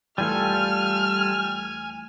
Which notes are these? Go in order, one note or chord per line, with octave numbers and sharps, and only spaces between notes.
E2 E3 G3 A3 F4 A4 G#5 F6